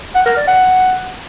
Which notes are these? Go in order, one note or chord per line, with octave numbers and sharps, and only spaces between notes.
F#5
A#4
D5
F#5